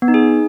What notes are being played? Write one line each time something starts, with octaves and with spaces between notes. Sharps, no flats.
B3
D#4
G#4